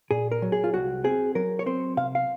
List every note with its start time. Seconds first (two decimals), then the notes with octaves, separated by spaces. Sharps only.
0.11 A#2 G#4
0.32 A#4
0.42 F#3
0.52 G#4
0.64 F4
0.73 C2 F#4
1.04 C4 G#4
1.35 F#3 A#4
1.59 C#5
1.66 C4 C5
1.97 C3 F5
2.15 F5